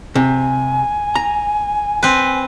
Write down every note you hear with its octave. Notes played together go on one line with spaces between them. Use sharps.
C3 G#5
A#5
C4 B4